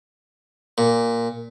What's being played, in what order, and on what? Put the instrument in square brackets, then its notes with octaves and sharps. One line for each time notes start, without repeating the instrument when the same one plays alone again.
[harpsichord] A#2